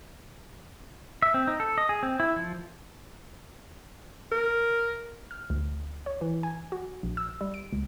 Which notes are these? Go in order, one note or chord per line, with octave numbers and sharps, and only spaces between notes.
E5
C4
D#4
A4
D#5
G#4
C4
E4
F3
A#4
F6
D2
C#5
E3
G#5
F#4
A#1
E6
G3
D7
C#2